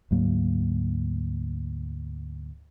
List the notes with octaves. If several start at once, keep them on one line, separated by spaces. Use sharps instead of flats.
D2 G#2 F#3 A#3